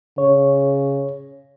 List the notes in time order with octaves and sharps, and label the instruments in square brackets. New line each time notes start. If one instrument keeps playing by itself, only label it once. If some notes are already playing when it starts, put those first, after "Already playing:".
[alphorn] C#3 [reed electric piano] C#5